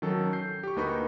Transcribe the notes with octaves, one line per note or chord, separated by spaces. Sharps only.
D#3 F#3 C#4 A4
G6 C7
G4 C#6
D2 A#3 D#4 B4 B5 C#6